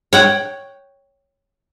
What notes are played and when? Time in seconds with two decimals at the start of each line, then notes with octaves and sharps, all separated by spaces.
0.13 C#5 F#5 G5